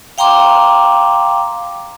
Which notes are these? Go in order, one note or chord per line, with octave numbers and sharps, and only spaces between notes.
F5 G5 A#5 C6 D6